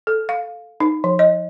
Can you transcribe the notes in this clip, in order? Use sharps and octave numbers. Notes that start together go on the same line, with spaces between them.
A4
F5
D#4
F3
D#5